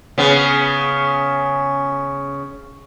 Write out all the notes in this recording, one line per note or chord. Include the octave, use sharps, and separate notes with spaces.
C#3 B3